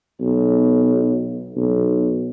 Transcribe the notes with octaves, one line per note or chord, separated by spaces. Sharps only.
B1
B1